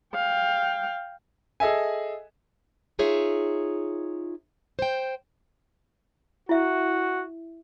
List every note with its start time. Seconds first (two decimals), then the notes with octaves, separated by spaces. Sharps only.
0.15 F5 G5
1.60 G#4 A4 D#5 E5 G#5
2.99 D#4 F4 G#4 C#5 E5
4.79 C5 G5
6.49 E4 F#4 E5